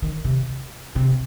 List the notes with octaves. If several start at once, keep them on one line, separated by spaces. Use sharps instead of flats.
D#3
C3
C3